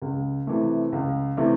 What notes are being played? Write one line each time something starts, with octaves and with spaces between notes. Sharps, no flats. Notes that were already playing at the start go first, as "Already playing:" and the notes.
C#2
C3 E3 A3
C#2
C3 E3 A3